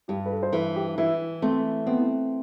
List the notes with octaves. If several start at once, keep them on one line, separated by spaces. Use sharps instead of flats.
G2 G4
B4
A4
C5
E3 B4
G4
E3 E4
A3 C4
B3 C4